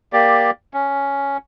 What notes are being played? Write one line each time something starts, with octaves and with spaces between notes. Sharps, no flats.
A#3 G4 D5
C#4